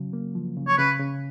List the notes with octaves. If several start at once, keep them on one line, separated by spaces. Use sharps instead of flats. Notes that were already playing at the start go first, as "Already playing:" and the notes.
Already playing: C#3 F#3
A#3
F3
C#3
C#5
C#3 B4
C#3